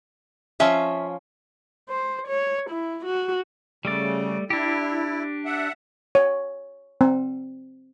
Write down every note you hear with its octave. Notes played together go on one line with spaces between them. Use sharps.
F3 C#4 F4 E5
C5
C#5
E4
F#4
C#3 G3 A3 D5
D4 E4 G4
E5 F#5
C#5
C4